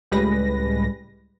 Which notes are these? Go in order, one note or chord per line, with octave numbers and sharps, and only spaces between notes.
C#2 A2 G3 G#3 B4 A#6